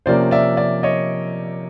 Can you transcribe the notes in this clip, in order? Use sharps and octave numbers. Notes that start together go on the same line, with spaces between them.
C3 F3 A#3 C#4 C5 D5
D5 E5
D5 E5
C#5 D#5